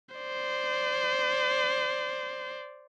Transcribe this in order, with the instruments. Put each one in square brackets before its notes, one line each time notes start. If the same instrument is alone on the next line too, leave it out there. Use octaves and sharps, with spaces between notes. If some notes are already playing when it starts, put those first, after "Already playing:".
[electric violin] C5 D5